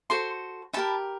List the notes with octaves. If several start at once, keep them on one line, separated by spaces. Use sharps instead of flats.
F#4 A4 C5 C6
D#4 G4 A#4 A5 B5